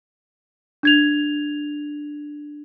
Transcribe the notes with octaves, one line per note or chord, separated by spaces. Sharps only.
D4 G#6 F7